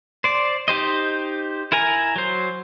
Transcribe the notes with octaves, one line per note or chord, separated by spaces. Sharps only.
C5 D5
D#4 G4 C5 D#5
E4 A#4 G#5 A#5
F#3 C5